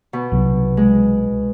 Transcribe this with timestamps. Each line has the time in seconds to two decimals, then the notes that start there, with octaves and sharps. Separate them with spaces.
0.13 B2
0.32 C2 C3 F#3
0.77 G#3